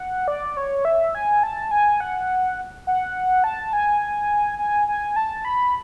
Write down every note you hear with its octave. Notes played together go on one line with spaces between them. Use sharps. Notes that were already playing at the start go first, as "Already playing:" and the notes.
Already playing: F#5
D5
C#5
E5
G#5
A5
G#5
F#5
F#5
A5
G#5
G#5
G#5
A5
B5